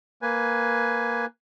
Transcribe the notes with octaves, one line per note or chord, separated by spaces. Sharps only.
A#3 B4 G#5